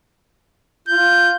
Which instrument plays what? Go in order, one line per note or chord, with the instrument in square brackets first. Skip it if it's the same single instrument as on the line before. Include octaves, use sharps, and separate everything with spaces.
[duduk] F4 [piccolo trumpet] G6